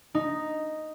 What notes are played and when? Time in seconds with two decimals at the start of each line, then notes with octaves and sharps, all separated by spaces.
0.15 D#4